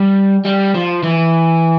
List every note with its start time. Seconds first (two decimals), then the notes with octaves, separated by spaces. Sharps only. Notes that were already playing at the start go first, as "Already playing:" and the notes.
Already playing: G3
0.45 G3
0.75 F3
1.03 E3